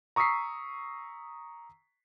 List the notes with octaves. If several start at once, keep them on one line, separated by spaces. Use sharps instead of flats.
A#5 C#6 D#6 E6 B6 C7